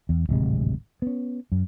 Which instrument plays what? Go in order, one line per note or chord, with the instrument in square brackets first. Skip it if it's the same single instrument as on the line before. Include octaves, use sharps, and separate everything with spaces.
[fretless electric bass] E2
D1 G#1 C3 G#3
B3 C#4
F#2